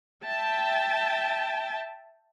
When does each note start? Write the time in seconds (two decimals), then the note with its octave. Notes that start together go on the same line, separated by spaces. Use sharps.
0.24 E5 G5 A5